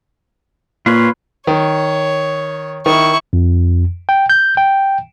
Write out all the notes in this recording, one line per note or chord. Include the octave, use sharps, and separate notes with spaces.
A#2 F4 B4 C#5
D#3 C#5
D#3 E4 C#6
F2
G5
G6
G5